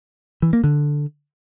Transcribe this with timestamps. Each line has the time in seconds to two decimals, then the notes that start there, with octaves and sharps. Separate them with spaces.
0.42 E3
0.53 A#3
0.64 D3